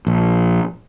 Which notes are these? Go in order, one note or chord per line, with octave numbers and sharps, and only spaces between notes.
A#1